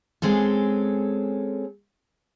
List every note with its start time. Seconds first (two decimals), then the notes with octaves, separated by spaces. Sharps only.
0.22 G#3 C4 C#4 A4